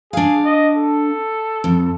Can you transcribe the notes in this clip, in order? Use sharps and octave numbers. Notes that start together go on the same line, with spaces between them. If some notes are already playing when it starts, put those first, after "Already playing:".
D4 G#4 F5
D#5
A4
F2